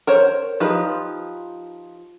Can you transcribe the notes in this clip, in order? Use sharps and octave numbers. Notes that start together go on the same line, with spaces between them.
A#4 C5 C#5
F3 D#4 F4 G4 B4